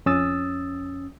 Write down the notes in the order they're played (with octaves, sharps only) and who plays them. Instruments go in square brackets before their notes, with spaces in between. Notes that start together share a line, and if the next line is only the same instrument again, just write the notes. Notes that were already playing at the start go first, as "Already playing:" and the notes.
[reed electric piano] F2 C#4 D#6 E6 A6